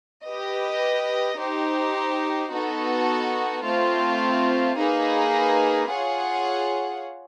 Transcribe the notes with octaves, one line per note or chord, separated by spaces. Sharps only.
G4 B4 D#5
D#4 G4 C5
B3 D#4 F#4 A4
A3 C4 F4
A#3 D#4 G#4 B4
F4 G#4 C#5 F#5